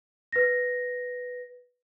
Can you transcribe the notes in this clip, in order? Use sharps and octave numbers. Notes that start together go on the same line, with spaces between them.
B4 A#6